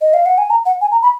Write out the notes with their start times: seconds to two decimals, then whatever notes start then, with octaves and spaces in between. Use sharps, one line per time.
0.01 D#5
0.14 F5
0.26 F#5
0.38 G#5
0.50 A#5
0.66 F#5
0.81 G#5
0.92 A#5
1.03 B5